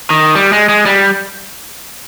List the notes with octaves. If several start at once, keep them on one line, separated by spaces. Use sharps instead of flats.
D#3
G3
G#3
G#3
G3